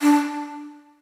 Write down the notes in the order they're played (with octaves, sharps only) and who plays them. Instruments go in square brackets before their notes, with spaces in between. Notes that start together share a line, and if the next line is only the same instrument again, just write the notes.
[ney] D4